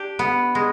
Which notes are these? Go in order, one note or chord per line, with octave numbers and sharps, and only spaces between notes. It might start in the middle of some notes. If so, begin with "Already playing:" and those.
Already playing: D4 G4
B3
G#3